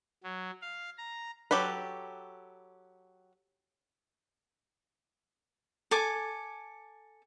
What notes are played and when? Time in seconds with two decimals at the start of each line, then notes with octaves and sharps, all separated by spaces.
0.23 F#3
0.62 F5
0.98 A#5
1.51 F#3 G4 A4 B4
5.91 A4 G#5 D6